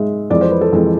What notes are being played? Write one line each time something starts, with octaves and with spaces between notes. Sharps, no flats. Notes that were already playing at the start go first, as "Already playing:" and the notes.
Already playing: G#2 G#3 E5
F2 E3 G#3 D5
C5
B4
A4
F2 E3 G#3